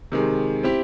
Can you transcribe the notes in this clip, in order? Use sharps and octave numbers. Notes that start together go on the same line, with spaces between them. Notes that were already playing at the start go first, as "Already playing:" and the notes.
C3 D#3 G#3
C4 E4 G4